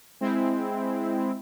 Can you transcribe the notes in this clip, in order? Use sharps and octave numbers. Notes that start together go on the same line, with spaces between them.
G#3 C4 E4